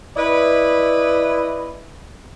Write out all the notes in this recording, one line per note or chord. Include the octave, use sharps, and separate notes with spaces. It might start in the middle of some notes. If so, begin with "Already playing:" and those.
E4 B4 D5 D#5